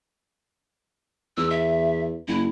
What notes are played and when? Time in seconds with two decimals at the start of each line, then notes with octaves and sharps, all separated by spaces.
1.37 E2 E6
1.50 E5
2.28 F#1 E4